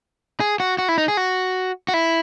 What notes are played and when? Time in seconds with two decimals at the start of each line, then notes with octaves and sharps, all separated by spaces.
0.40 G#4
0.60 F#4
0.78 F#4
0.89 E4
0.98 D#4
1.08 G#4
1.17 F#4
1.88 F#4
1.94 E4